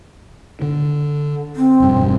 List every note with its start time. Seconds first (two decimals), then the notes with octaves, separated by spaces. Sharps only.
0.62 D3
1.56 C4
1.80 E1 G2